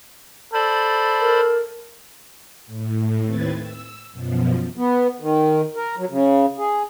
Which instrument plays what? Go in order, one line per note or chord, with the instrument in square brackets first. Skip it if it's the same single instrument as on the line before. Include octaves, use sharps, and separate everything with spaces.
[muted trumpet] A4 [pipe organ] C5 D5 B5
[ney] A#4
[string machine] A2
D#2 A2 C4 B4 G#6 A6
E6
F#2 B2 F3
[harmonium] B3
D#3
A#4
F#3
C#3
G#4